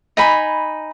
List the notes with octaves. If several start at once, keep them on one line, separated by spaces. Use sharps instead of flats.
D#4 G#5 B5